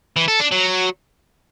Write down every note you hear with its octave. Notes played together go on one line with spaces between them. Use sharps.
E3
A4
D4
F#3